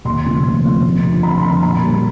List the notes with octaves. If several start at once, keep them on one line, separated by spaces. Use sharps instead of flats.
D#2 C6
C#3 F3 A3
D#2
C#3 F3 A3
F2
D3 F3
F2 B5
C6
D3 F3 B5
A#2 B5
G3 A#3